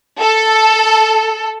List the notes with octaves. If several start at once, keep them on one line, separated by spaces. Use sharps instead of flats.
A4